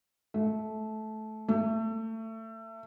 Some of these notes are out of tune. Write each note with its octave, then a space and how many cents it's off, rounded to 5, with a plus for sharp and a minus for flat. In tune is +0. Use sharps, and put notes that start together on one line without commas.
A3 -15
A3 +25